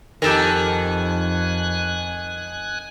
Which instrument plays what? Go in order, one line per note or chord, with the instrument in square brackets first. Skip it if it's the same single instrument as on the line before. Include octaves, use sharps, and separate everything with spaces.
[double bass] F2 [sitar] D#3 [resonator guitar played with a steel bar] G4 A4 A#4 [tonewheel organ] G#5 F#6